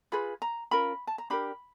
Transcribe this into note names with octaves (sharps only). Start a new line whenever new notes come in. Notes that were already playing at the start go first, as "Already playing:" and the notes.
F4 G#4 B4 B5
A#5
C#4 F4 A#4 B5
A5
A#5
D4 G4 A#4 B5